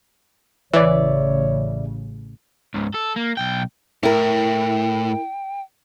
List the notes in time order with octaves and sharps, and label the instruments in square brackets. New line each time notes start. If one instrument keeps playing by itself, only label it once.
[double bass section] A1 C#3 [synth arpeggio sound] E3 [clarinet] C#5 [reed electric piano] D5 E5
[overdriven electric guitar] C#2 G#2
A4
A#3
B1 G5
[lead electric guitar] A2 [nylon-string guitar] E4 A#4 [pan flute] G5